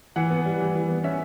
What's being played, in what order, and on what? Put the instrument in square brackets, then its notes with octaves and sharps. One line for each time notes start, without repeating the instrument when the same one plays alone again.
[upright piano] E3 F#5
B3
G3
E3
E3
B3
C#4 E5